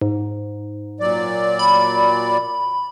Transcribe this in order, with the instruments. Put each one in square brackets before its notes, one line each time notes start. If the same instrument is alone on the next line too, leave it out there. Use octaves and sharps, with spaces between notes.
[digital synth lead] G#2
[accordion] A#2 F#3 D5
[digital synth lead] B5